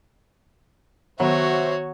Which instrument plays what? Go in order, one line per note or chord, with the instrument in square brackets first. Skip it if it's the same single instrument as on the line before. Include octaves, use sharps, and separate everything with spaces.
[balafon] D#3 B3 [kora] F#3 [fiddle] F#4 C#5 [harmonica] C5 E5